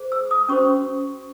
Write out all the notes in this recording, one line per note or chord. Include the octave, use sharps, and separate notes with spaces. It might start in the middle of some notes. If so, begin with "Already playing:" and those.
Already playing: G#4 C5
E6
D#6
C#4 F#4 C5 C#6